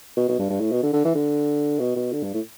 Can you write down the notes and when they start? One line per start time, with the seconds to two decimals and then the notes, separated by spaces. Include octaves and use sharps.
0.17 B2
0.28 B2
0.39 G2
0.49 G2
0.60 A2
0.72 B2
0.83 D3
0.93 D3
1.05 E3
1.15 D3
1.79 B2
1.96 B2
2.13 D3
2.23 G2
2.34 A2